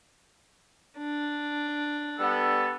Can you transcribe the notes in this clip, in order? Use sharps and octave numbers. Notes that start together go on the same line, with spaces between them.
D4
G3 B3 A4